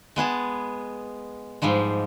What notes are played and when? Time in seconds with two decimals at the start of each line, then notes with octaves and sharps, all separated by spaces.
0.16 G#3 B3 G#4 A5
1.62 G#2 F3 G3 G#3